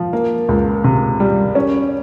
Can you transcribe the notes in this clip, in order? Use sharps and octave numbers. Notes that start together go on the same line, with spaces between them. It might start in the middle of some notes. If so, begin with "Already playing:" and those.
Already playing: F3
A#3
C#2
C3
G3
C#4